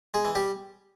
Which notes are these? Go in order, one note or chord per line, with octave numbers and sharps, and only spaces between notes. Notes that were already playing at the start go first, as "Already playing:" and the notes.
G#3 G#4
E3
G3 G4